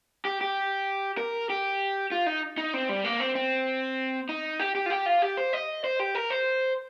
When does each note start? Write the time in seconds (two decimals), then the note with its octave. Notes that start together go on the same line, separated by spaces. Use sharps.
0.25 G4
0.41 G4
1.17 A#4
1.50 G4
2.12 F4
2.26 D#4
2.58 D#4
2.74 C4
2.89 G3
3.05 A#3
3.20 C4
3.35 C4
4.29 D#4
4.59 G4
4.75 G4
4.86 F4
4.90 G4
5.06 F4
5.22 G4
5.37 C5
5.53 D#5
5.84 C5
5.99 G4
6.15 A#4
6.30 C5